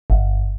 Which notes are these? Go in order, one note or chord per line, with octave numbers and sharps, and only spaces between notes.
G1